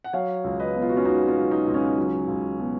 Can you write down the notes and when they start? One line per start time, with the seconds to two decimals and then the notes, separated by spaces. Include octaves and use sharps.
0.04 F#5
0.13 F#3 C#5 F5
0.44 C#2
0.59 B4 D#5
0.75 B2
0.82 F4
0.89 F#4
0.96 C#4 F4
1.05 C#2 D#4 F#4
1.28 C#4 F4
1.36 F#3
1.51 D#4
1.67 C#2
1.74 C#4
1.98 F#3
2.28 C#2
2.59 B2